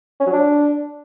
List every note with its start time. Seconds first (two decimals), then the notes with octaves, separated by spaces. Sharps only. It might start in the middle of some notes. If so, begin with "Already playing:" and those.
0.20 C#4
0.27 F#3
0.33 D4